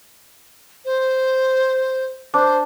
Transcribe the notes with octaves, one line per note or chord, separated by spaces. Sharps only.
C5
D4 C5